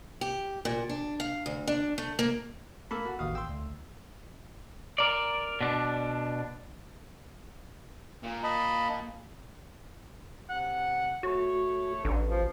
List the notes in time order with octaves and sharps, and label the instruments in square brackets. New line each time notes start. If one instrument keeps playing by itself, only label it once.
[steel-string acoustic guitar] G4
A#2
D4
F5
D2
D4
A3
A#3
[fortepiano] A#3 A4 [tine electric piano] B5
[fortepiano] F#4
[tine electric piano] A1 D#2 F#4 [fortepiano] F5 D#6
[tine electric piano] G5 C6 [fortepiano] E6
[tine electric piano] D2
[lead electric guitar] A#4 D5
B2 D4
[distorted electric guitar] A#2
[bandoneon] D#5 A5 B5
[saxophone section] C3 F#5
[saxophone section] A3 C#5 [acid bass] F#4
[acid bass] A1 [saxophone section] D3
[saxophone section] B2 F3